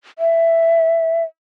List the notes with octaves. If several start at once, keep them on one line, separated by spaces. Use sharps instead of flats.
E5